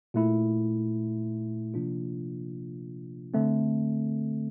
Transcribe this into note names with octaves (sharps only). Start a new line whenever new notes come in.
A#2 A3 E4
C3 F3 A#3 D4 F4
D3 A3 C4